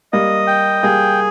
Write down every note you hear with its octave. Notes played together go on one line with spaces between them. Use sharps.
G3 A#3 D#5
G5
G3 A#3 G#4